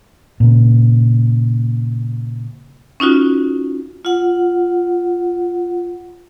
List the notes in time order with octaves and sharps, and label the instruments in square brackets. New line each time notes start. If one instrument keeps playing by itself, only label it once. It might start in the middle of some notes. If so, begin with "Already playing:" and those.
[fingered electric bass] A#2 C#3
[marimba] C#4 D#4 F4 F#4
[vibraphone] F4 F#5